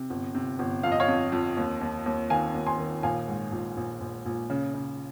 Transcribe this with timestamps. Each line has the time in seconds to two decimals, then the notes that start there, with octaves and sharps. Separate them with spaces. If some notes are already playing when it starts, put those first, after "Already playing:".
Already playing: C3
0.10 G1
0.35 C3
0.59 G1
0.83 F2 F5
0.92 D#5
1.00 C#5 F5
1.08 F2
1.32 F2
1.57 D#2
1.81 D#2
2.06 D#2
2.30 D#3 F5 G#5
2.54 D#2
2.66 G#5 C6
2.79 D#3
3.03 A#1 F5 G#5
3.28 G#2
3.52 A#1
3.77 A#1
4.01 A#1
4.25 A#1
4.50 C#3
4.74 C#3